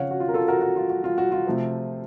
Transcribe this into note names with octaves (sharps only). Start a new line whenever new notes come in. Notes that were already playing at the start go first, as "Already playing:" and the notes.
Already playing: C#3 F3 C4 C#5 F5 F#5
F#4
F4
A#4
F4 A4
F#4 A#4
F#4
F4
F#4
F4
F#4
F4
C3 F3 A3 C4